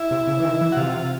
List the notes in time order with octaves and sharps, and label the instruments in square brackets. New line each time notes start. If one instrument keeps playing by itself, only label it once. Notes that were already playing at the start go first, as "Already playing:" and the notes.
Already playing: [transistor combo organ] E4
[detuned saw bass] C3
C#3
E3
D#3
E3
[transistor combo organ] F#4
[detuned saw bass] C3 [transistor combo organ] F4